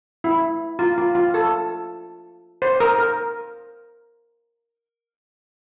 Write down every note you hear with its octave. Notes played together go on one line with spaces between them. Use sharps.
E4
F4
F4
F4
A4
C5
A#4
A#4